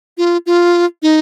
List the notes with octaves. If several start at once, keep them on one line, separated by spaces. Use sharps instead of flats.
F4
F4
D#4